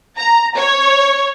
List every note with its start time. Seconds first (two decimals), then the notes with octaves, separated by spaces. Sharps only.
0.17 A#5
0.56 C#5